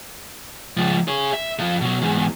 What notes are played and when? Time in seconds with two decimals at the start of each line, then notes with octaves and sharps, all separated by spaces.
0.77 C#2 F3
1.08 G#4 C#5
1.33 E5
1.59 F3 A4
1.81 B2 F#3
2.02 E2 G#2